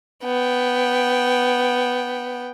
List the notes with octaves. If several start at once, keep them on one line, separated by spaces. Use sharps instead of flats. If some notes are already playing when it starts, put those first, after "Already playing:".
B3 G5